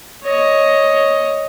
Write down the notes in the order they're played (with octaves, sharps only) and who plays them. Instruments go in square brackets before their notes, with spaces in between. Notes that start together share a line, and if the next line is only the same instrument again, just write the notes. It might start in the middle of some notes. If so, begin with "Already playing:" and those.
[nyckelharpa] C#5 D#5